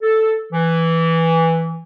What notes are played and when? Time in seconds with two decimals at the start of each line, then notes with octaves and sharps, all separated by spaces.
0.02 A4
0.53 E3